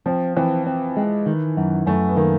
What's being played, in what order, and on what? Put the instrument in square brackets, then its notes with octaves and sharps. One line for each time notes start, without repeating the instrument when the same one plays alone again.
[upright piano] F3 [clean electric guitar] C4
[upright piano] E3 [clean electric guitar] C4
[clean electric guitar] C4
G#3
D#3
F#2
[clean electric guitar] F#2 [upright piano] A3
[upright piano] B3
[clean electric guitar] D#3 [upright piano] A#3